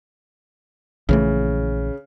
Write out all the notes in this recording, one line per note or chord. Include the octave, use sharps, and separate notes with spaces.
A#1 C#3 E3 A3